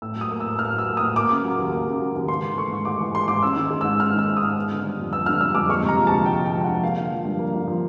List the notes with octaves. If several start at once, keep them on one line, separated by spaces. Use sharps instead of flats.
A2 E6
F#3
D#6
A#3
A2 E6
A2 F6
F#3 E6
A#3
A2 D#6
A#3 D6
C#3
F#3
D#2
A#3
C#3
F#3
D#2
G#2 C6
E3
A3 C#6
G#2
G#2 D6
E3
A3 C6
G#2 D6
C#4 E6
D#3
G#3
G#2 E6
C#4 F6
D#3 E6
G#3
G#2 D#6
B3
D3
G3
F2
B3 E6
D3 F6
G3 E6
F2 D6
G#3 C#6
C3
A#5
F3
D2 A5
G#3 G5
C3
G5
F3
D2 F#5
A#3 F5
D3
F3
G2
A#3
D3
F3